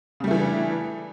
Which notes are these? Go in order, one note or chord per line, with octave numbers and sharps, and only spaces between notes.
C#3 E3 G3 A3 D4